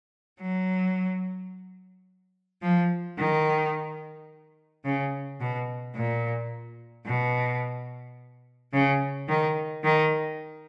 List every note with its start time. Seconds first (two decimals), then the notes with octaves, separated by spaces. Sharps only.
0.41 F#3
2.62 F3
3.19 D#3
4.85 C#3
5.40 B2
5.95 A#2
7.06 B2
8.73 C#3
9.28 D#3
9.84 D#3